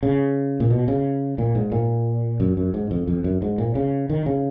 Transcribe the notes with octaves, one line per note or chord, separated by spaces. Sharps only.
C#3
A#2
B2
C#3
A#2
G#2
A#2
F#2
F#2
G#2
F2
F2
F#2
G#2
A#2
C#3
D#3
C#3